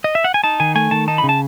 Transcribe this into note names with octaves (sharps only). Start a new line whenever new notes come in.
D#5
E5
F#5
G#5
D#4 A5
D#3 G#5
A3 G#5
D#3 A5
D#4 A5
B5
C#3
A5